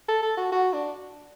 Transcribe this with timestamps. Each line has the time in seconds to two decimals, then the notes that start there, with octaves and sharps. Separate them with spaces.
0.09 A4
0.22 A4
0.37 F#4
0.52 F#4
0.73 D4